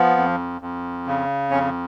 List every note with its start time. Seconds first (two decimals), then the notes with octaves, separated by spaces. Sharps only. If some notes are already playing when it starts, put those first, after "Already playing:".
Already playing: F3 B3
0.17 F2
0.61 F2
1.07 C#3
1.50 F2 C#4